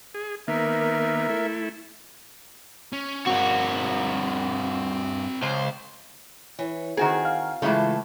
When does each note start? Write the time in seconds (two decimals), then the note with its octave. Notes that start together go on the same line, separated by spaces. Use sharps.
0.14 G#4
0.48 D#3 A#3 B3 A#4 E5
1.29 A3 E4
2.93 C#4
3.27 G2 C4 F#4 A#4
5.42 C#2 C5
6.59 E3 C#5
6.97 D#3 C4 F#4 G#4
7.25 F5
7.62 A2 C#3 E3 G#3 A3 E4 F4 A4